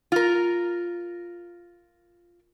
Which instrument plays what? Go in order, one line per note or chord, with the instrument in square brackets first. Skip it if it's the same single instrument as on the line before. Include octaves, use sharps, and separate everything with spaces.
[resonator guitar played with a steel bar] F4 A#4